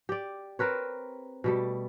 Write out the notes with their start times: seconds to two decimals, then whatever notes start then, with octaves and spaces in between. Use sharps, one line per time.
0.09 G4 D5
0.59 C4 A#4 B4 C#5
1.44 B2 G3 A3